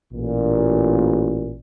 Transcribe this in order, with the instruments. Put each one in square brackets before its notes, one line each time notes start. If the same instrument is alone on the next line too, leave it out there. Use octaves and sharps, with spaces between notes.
[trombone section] A1 A#2